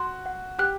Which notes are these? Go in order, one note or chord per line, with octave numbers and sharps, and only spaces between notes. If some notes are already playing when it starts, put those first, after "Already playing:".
Already playing: F#4 C6
F#5
G4 F#6